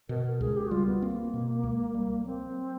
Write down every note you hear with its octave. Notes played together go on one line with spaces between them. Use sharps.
B2 A#4
A#4
C#2 G#4
G4
F#4
G3 F4
B3
A#3 C4
B2
C#2
G3
F#3 C4